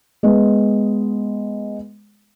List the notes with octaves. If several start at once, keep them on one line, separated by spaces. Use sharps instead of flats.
G#3 B3